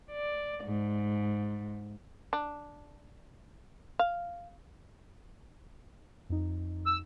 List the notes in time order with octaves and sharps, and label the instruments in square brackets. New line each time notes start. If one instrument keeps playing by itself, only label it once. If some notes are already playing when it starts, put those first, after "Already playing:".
[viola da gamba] D5
G#2
[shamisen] D4
F5
[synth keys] F2 D#4
[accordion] E6